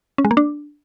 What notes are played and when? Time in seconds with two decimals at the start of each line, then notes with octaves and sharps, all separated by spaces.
0.18 C#4
0.25 G#3
0.31 A#3
0.37 D4